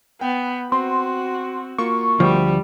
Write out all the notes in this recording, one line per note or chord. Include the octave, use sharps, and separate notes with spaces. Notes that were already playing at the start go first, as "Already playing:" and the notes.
B3 G5
C4 F#4 C6
A#3 F4 F#4 C#6
D2 F3 G3